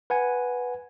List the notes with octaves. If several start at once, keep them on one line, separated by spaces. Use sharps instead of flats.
B4 F#5 G#5